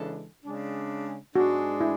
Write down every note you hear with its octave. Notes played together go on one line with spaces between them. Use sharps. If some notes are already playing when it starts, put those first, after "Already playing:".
Already playing: C#3 E3 G#3 D4 A4
C#3 G#3 D4
G#2 G#3 D4 F#4
E4